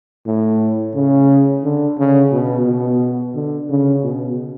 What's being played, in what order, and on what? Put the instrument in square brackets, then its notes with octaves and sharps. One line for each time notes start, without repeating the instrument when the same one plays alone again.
[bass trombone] A2
C#3
D3
C#3
B2
B2
D3
C#3
B2